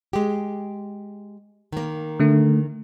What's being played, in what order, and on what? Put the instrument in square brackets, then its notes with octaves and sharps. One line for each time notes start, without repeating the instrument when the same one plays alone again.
[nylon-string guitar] G#3 G4
D#3 A#3
[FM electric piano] D3 A3